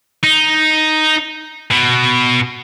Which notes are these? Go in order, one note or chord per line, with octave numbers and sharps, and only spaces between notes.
D#4
B2